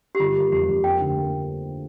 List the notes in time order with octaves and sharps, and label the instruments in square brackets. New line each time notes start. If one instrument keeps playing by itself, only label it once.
[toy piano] G4
[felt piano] G1 [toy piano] F4
[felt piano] A#3
[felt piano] F2 [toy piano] G4
[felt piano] F2
[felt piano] A#3 [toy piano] G5
[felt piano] D2
A#3